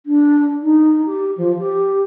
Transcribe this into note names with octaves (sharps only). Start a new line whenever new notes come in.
D4
D#4
G4
F3
G4